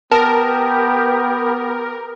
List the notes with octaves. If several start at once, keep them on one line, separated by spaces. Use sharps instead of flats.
B3 G4 A#4 A5